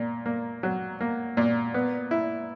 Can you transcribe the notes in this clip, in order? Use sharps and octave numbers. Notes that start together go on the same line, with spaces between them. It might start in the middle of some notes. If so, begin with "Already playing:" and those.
Already playing: A#2
A#3
F#3
A#3
A#2
B3
E4